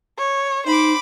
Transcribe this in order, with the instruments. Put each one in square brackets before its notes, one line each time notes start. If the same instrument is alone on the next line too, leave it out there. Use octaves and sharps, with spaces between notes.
[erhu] C#5
[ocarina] D#4 [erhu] C5 [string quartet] B5 D6